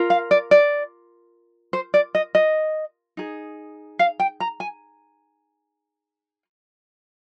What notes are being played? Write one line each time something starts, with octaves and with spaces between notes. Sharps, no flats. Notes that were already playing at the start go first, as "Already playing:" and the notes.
Already playing: F4 A#4
F5
D5
D5
C5
D5
D#5
D#5
D#4 G#4
F5
G5
A#5
G#5